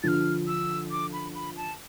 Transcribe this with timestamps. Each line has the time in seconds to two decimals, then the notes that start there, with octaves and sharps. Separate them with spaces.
0.03 D3 F3 F6 A6
0.47 E6
0.91 D6
1.13 B5
1.35 B5
1.57 A5